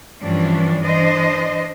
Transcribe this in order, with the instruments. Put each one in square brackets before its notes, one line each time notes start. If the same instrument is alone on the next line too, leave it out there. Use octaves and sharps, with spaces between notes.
[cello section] G2 E3 F3 C#4 D4
E3 D4 C5 D#5